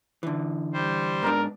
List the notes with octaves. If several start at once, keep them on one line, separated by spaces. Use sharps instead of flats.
D3 E3
G3 C5
G#2 B3 D4 A#4